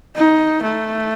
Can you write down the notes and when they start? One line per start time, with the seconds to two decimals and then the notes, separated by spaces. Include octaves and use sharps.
0.16 D#4
0.63 A3